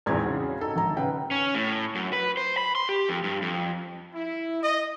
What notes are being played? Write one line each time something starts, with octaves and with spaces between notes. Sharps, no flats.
A#1 E2 G#2 C4 G#4 G#6
C#3 F#4
D#4 A4
G#1 A#5
C#3 B4 F#5 G5
C#4
A2
F#2
B4
C5
B5
C6
G4
F2
G2
F2
E4
D#5